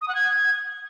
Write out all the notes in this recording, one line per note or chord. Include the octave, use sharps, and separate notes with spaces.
D#6
F#5
G#6